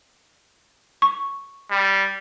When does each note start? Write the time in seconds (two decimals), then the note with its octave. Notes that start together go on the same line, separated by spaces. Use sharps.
1.02 C#6
1.71 G3